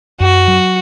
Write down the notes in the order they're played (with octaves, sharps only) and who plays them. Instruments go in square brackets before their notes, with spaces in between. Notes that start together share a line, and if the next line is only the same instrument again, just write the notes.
[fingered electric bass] F#2 [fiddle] F#4
[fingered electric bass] F#3